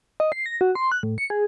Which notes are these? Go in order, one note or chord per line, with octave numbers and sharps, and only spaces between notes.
D#5
C7
A#6
F#4
C6
F#6
A2
C#7
G#4